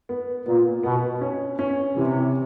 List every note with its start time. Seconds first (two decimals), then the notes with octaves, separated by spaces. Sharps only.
0.09 B3
0.46 A#2 B3
0.83 B2 B3
1.21 C#4
1.59 C#4
1.96 C3 E3